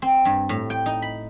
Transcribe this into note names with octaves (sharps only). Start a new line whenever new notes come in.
C4
G2
A2
G5
D#4
B5